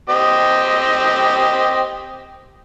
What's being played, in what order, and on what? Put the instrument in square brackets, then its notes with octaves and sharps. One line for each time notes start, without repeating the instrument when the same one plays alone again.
[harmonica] C4 G4 D#5